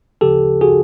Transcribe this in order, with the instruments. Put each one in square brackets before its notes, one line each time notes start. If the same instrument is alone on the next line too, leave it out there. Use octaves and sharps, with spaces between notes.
[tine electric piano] D2 C#3 F3 G4 A4
F#4 G#4